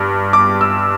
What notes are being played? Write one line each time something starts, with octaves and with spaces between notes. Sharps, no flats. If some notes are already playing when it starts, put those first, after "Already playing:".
Already playing: G2 D6
D6
E6